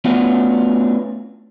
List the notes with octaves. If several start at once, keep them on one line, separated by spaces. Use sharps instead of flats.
A3 B3 C#4 D4 F4 F#4